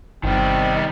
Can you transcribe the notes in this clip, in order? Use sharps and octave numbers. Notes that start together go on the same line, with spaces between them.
G1 C3 D#3 G3 B3 C4